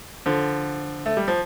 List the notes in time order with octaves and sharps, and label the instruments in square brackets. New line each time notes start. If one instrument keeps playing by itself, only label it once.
[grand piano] D3 F3
A3
G3
F3